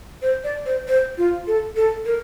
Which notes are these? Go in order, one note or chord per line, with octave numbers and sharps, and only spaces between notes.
C5
D5
C5
C5
F4
A4
A4
A#4